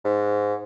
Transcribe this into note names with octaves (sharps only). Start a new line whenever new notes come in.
G#2